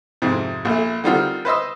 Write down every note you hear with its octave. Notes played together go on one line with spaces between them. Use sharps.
F2 G#2 C3
A#1 A3
D3 D#3 G3 C4 F4 F#4
B4 C5 D#5 E6